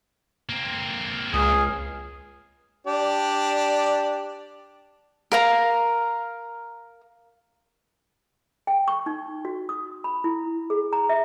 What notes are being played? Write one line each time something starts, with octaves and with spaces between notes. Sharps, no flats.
A#3 C4
C#2 G#4 D#6 F6
D4 G4 D5
A#4 F5 A#5
G5
C#6
D#4
F#4
D#6
B5
E4
G#4
A#5
E5